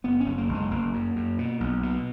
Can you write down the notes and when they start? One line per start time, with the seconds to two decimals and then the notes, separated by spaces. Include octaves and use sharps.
0.04 F#1 B3
0.20 C#4
0.26 F#1
0.38 A#3
0.49 F#1
0.55 G#3
0.71 F#1 A#3
0.94 F#2
1.16 F#2
1.38 B2
1.60 B1
1.83 B2